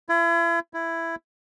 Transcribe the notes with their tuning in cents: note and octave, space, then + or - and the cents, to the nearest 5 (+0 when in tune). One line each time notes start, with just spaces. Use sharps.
E4 +40
E4 +10